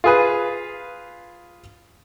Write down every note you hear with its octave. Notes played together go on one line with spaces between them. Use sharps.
F4 G#4 B4